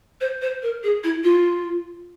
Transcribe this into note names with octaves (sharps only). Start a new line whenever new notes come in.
C5
C5
A#4
G#4
E4
F4